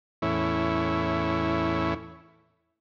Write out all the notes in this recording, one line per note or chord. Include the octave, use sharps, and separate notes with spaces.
E2 A2 C#4 E4